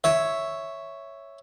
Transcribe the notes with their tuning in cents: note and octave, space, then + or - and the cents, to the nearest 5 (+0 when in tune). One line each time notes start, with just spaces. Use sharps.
C#5 +0 E5 +0